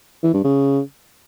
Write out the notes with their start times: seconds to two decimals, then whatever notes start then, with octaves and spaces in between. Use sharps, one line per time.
0.23 E3
0.34 G2
0.44 C#3